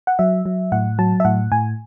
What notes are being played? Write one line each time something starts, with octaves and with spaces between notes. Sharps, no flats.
F#5
F#3 E5
F#3
A2 F#5
F#3 A5
E5
A2 F#5
A2 G#5